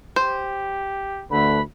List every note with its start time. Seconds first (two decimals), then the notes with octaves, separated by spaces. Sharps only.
0.16 G4 C5
1.31 D2 D3 A3 B4 B5